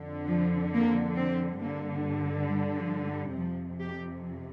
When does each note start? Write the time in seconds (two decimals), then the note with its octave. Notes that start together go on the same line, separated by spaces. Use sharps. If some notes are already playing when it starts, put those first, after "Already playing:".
Already playing: F2 D3
0.28 F3
0.73 A#3
1.17 C4
1.60 G2 D3 A#3
2.48 G3
2.78 F3
3.07 G3
3.36 F2 C3 F3
3.80 G4